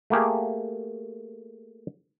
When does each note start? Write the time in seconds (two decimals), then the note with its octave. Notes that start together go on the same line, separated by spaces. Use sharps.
0.10 A3 A#3 G4 G#4